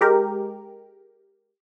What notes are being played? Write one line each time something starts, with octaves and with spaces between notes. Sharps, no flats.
G#3 G4 A#4